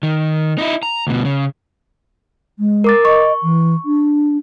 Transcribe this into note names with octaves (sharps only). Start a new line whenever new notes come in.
D#3
D#4 E4
A#5
D2 B2
C#3
G#3
A#4 D6 A6
D#5 C#6
E3
D4